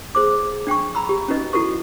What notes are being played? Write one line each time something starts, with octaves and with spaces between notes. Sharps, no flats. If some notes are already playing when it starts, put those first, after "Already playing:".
G#4 C5 D6
D4 G5 G#5 C#6
A#5 B5 E6
G4
C#4 D#4 F#4 B4 D#5
E4 F#4 A4 B4 C#6